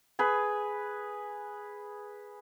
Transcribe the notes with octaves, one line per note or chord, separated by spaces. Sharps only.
G#4 B4